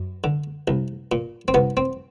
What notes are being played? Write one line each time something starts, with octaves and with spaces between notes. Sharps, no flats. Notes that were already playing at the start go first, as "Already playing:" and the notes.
Already playing: F#2
D3
C2
A#2
C4
C2 B3
C4